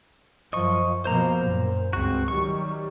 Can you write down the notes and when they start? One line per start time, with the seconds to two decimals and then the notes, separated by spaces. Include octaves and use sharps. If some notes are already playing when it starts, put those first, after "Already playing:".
0.53 F#2 F3 D#5 C#6
1.05 B2 F3 A#3 C5 A#5
1.47 F#2 A#2
1.93 C#2 G2 C4 F#4
2.28 D#3 F#3 G3 C#6